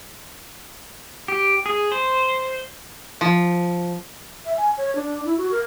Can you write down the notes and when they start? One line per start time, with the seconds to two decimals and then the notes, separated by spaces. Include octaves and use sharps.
1.28 G4
1.66 G#4
1.92 C5
3.21 F3
4.45 E5
4.57 G#5
4.77 C#5
4.95 D4
5.25 E4
5.38 F#4
5.51 A#4